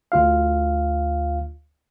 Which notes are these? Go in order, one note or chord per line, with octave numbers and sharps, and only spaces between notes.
D2 F4 F5